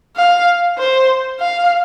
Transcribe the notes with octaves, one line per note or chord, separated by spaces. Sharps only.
F5
C5
F5